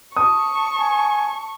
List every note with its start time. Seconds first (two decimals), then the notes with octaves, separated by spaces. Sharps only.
0.16 A5 C#6 D#6
0.79 G#5